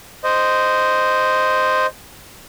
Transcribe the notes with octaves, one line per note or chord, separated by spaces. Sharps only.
C5 D#5